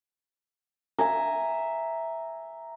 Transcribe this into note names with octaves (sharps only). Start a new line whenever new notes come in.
E5 G#5 A#5